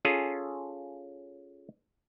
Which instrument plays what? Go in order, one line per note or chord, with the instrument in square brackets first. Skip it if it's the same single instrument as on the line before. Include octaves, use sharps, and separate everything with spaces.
[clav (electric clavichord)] C#4 F4 G#4 A4